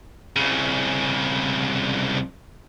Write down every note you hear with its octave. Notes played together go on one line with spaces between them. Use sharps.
C2 C#3